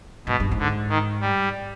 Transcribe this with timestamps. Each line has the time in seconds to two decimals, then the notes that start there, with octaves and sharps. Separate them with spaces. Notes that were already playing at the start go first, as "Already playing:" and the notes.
0.27 G#2 B2
0.40 G2
0.51 G#2
0.58 D3
0.89 D#3
1.21 G3